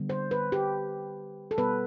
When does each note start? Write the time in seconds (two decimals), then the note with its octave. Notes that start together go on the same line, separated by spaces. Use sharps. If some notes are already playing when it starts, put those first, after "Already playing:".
Already playing: D3 G3 B3
0.09 C5
0.31 B4
0.52 G4
1.51 A4
1.57 B2 G3 B3 B4